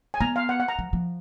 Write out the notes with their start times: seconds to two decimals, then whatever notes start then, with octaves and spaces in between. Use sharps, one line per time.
0.14 G#5
0.20 B3 A#5
0.36 F5
0.49 F#5
0.60 F#5
0.68 A#5
0.79 F3
0.93 F3